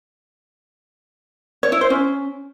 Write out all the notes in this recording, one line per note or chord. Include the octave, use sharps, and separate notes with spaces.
C#5
E4
C5
C#4